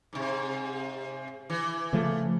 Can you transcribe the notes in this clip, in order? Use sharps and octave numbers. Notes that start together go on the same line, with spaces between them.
G#2 C3
E3
C#3 F3 A3